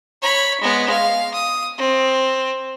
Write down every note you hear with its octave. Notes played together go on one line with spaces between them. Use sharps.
C#5 B5
G#3 B3
F5
D#6
C4